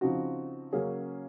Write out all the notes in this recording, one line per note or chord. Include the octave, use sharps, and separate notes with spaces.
C#3 F3 C4 D#4 F#4
C#3 F#3 A#3 C#4 G#4